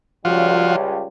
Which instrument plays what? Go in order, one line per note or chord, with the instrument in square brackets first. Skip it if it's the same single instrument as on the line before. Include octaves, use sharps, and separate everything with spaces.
[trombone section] C#2 G3 [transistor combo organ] F3 F4 F#4